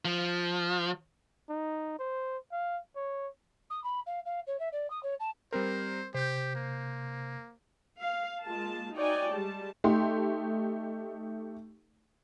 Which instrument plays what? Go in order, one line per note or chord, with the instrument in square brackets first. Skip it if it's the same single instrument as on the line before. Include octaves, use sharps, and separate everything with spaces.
[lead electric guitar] F3
[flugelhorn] D#4
C5
F5
C#5
[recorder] D#6
B5
F5
F5
C#5
E5
D5
D#6
C#5
A5
[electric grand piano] G3 C4 A#4 [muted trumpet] C5
[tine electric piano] C3 G6 [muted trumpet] G4 [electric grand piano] C5
[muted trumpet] A#3
[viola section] F5
G#3 A#3 F4 A5
D#4 F#4 C#5 D5 G5 G#5
G3 G#3 A5
[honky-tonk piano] A3 D#4 G4 C6